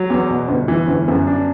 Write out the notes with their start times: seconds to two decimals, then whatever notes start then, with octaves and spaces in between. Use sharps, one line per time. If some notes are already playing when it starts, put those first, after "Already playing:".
Already playing: F#3
0.10 E2
0.30 B2
0.48 G1
0.68 E3
0.88 G1
1.08 F#2
1.27 D4